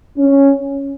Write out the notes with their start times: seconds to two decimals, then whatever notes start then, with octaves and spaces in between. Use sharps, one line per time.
0.18 C#4